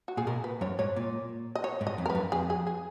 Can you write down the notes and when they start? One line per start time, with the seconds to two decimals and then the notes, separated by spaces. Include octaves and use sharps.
0.08 F#4
0.17 A#2 G#4
0.27 B2 A#4
0.44 B4
0.61 F#2 C#5
0.79 G#2 C#5
0.96 A#2
1.55 D#5
1.64 C#5
1.81 G#2
1.87 D#5
1.98 F2
2.06 A#4
2.10 B4
2.15 F#2
2.32 F2 G#4
2.50 G#4
2.67 G#4